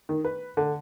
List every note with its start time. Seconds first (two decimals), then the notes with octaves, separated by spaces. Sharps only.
0.09 D#3
0.25 B4
0.57 D3